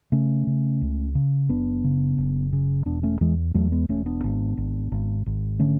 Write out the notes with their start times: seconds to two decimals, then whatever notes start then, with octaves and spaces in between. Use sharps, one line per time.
0.12 C#3 A3 C#4
0.47 C#3
0.82 C#2
1.15 C#3
1.49 F#1 B3 D4
1.84 C#3
2.18 F#1
2.53 C#3
2.86 E1 B3 D4
3.03 A3 C#4
3.21 E2 E3 G#3
3.54 E2 F#3 A3
3.72 G#3 B3
3.89 E1 A3 C#4
4.06 B3 D4
4.24 G#1
4.57 G#1
4.92 G#1
5.26 G#1
5.59 D3 A3 C#4